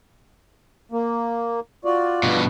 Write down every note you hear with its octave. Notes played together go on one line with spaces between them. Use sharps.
A#3
F4 F#4 D5
G2 B2